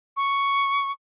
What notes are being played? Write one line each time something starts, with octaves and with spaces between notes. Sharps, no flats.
C#6